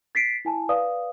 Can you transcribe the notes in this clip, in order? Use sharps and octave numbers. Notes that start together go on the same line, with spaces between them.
A6 B6 C7 D7
E4 G#5 A5
B4 D5 F5 D#6